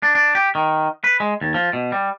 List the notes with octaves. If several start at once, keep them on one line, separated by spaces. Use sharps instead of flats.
D4
D4
G4
D#3
B4
G#3
D#2
F3
B2
G3